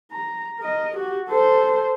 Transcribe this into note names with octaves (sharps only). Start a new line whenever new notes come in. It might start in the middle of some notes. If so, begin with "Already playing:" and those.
A#5
A#4 D#5
F#4 G4
A4 C5